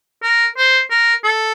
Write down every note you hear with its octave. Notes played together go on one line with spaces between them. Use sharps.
A#4
C5
A#4
A4